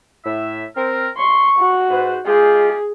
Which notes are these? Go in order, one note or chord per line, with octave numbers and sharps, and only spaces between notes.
A2 E5
C4 A#4
C6 C#6
F#4
G#2 B4 C5
G#3 F4 G4 G#4